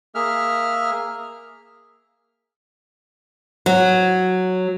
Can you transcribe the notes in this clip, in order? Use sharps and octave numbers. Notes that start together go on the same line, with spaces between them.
A#3 G#4 E5 F6
F#3